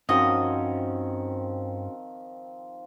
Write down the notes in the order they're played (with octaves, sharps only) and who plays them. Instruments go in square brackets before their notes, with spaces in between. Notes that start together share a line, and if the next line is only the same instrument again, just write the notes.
[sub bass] G2 [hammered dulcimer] D#3 F3 C4 [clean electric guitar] C#4 F#4 [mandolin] D#5